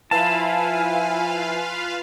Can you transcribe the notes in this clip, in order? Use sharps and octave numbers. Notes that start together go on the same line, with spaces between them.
F3 E4 F4 B4 F5 G#5 A5